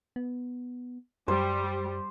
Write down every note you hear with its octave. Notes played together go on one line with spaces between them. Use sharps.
B3
F#2 G3 C5